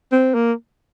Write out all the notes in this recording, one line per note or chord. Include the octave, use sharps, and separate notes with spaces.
C4
A#3